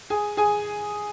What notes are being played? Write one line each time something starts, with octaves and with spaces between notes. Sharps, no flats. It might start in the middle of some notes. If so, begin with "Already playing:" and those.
G#4 G#5
G#4 G#5